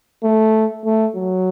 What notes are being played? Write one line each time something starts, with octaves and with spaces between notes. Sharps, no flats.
A3
A3
F#3